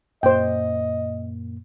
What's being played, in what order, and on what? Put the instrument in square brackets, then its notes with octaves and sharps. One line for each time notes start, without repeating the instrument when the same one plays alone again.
[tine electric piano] F#2 A#2 A#3 [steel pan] C5 G5 [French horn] D#5